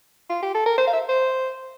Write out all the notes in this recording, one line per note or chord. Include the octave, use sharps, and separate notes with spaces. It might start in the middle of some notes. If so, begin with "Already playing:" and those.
F4
G4
A4
A#4
C5
F5
E5
C5